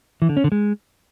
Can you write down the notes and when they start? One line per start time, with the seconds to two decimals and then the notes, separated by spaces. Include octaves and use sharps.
0.22 E3
0.29 D3
0.37 C#4
0.44 D3
0.52 G#3